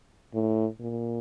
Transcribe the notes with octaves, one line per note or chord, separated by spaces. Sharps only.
A2
A#2